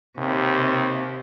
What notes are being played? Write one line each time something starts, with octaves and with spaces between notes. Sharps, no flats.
D#2 C3